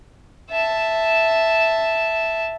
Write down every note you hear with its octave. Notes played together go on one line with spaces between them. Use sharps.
E5 A5